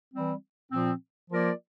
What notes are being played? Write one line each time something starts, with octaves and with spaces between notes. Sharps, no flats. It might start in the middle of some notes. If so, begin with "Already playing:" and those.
E3 G3 C4
A#2 F3 C4
F3 A#3 F4 A#4 D5